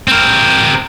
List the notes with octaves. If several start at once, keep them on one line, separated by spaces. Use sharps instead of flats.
C4 A#4